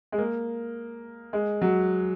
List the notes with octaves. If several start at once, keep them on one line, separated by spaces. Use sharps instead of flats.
G#3
A#3
G#3
F#3